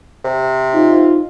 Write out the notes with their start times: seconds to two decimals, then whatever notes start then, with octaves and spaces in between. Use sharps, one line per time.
0.24 C3
0.74 D#4 F4